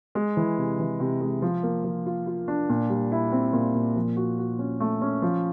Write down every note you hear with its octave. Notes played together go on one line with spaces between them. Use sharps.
G#3
E3
C3
E3
C3
G#3
F3
A#3
F3
F4
F4
D4
A#2
G3
E4
C4
A#2
A#2
F3
F#4
F#4
C#4
A3
C#4
F3